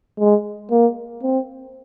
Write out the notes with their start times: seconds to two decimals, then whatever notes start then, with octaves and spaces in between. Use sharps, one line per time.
0.19 G#3
0.71 A#3
1.23 C4